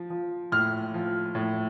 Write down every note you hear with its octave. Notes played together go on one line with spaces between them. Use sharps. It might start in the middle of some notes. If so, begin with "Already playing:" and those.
Already playing: F3
F3
A2 F6
F3
A2